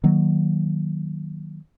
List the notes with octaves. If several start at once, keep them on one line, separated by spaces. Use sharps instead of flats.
D#3 F#3 A#3